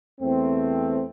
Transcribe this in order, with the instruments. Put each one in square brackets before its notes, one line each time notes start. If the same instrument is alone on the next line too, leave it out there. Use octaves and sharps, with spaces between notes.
[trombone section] E2 A3 C4